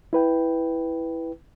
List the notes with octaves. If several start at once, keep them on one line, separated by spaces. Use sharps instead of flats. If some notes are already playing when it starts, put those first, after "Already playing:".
E4 B4 G5